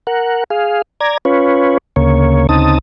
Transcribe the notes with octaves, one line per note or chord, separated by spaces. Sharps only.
A#4 F#5
G#4 F5
D5 A#5 G#6
C#4 F4 B4 C#5
D2 C#3 A#3 C#5
D2 C#3 C4 D#4 A5 D#6